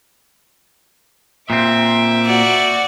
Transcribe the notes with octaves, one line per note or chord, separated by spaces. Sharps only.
A#2 C4 E5 D6
F#4 D5